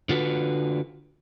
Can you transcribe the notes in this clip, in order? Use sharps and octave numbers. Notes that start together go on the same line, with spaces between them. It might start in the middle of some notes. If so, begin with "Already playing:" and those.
D3 F4 F#4 B4